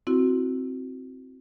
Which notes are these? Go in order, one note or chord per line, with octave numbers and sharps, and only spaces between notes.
C4 E4 F#4